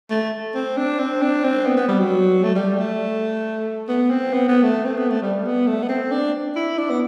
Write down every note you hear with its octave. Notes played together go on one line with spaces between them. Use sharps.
A3
C4
D4
C4
D4
C4
B3
B3
G3
F#3
A3
G3
A3
B3
C4
B3
B3
A3
C4
B3
A3
G3
B3
A3
B3
C4
D4
E4
D4
B3